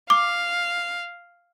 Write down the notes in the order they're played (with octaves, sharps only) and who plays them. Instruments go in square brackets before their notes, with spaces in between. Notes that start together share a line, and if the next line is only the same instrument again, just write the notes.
[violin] F5 [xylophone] D6